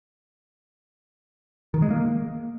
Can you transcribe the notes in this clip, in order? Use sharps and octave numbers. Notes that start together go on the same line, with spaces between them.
D#3
G#3
A#3